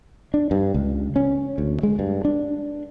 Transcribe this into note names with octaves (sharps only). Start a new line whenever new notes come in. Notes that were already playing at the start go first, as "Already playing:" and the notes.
D4
G2
C#2
C#4
D2
G#3
G2
D4